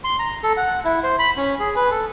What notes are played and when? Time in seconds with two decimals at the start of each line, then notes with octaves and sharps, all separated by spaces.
0.04 C6
0.19 A#5
0.43 A4
0.57 F#5
0.84 E4
1.03 C5
1.19 B5
1.37 C#4
1.59 G#4
1.76 B4
1.91 A4